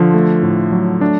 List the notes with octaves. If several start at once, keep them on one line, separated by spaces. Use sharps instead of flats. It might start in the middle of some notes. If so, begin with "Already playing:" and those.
Already playing: D3 F3 F4
A3
A2
F#3
A3 D4